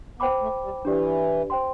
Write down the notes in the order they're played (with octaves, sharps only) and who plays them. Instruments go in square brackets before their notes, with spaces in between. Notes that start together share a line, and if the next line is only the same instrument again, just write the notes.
[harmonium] B3 [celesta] C5 G5 B5 D6
[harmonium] A3
G3
[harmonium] E3 [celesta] D4 G4 D5
[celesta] C5 G5 C6